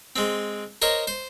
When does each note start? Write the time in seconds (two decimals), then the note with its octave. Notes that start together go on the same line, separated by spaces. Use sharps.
0.16 G#3 C4
0.82 A#4 C5 C#5 D#5
1.07 C5